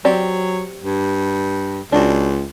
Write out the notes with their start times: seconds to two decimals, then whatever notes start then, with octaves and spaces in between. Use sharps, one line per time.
0.05 F#3 C4 G4 D5
0.83 G2
1.92 C#2 D4 F#4